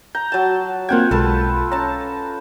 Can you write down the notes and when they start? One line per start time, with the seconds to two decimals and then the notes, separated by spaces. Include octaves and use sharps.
0.15 A#5 G6
0.32 F#3 A5
0.89 A#3 C4 F4 F#5 G5 G#6
1.11 B1 G#3 A4 B4 A5
1.72 C#4 A5 A#5